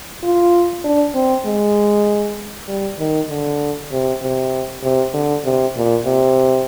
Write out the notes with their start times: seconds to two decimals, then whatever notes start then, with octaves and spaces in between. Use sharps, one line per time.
0.23 F4
0.84 D4
1.14 C4
1.45 G#3
2.68 G3
2.99 D#3
3.29 D3
3.92 C3
4.22 C3
4.83 C3
5.14 D3
5.45 C3
5.76 A#2
6.06 C3